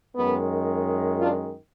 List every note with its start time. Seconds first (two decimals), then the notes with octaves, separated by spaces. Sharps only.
0.15 F#2 D#3 G#3 B3
1.19 D4 F4